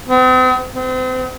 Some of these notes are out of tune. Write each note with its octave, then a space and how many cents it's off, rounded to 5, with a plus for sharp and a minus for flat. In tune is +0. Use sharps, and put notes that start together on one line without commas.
C4 -45
C4 -35